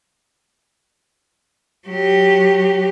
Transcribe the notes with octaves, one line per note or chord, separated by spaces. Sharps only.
F#3 G4